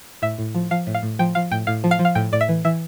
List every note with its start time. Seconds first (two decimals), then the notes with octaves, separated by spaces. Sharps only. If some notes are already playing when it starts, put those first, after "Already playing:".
0.22 A2 E5
0.38 A2
0.55 F3
0.71 F3 F5
0.87 A2
0.94 F5
1.03 A2
1.19 F3 G5
1.35 F3 F5
1.51 A2 G5
1.67 A2 F5
1.84 F3
1.91 F5
1.99 F3
2.05 F5
2.15 A2 G5
2.32 A2 D5
2.41 E5
2.49 E3
2.64 E3 E5